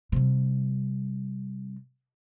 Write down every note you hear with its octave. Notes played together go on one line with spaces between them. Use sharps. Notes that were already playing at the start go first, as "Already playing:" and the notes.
C3 G3